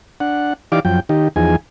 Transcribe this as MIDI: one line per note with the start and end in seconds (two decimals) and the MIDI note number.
0.20 0.53 62
0.20 0.53 78
0.72 0.80 52
0.72 0.80 63
0.72 0.80 67
0.72 0.80 74
0.72 0.80 77
0.72 0.80 86
0.85 1.00 42
0.85 1.00 53
0.85 1.00 79
1.09 1.28 51
1.09 1.28 63
1.09 1.28 67
1.36 1.56 40
1.36 1.56 53
1.36 1.56 63
1.36 1.56 68
1.36 1.56 80